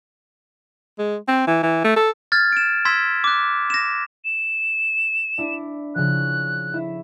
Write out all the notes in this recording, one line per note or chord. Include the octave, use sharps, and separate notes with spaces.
G#3
C4
E3
E3
A3
A4
F6 G#6 A6
D7 E7
C6 E6 G#6 B6 E7
D6 F#6
A#6 E7
E7
D4 E4
C#3 F3 F#6
E4 E5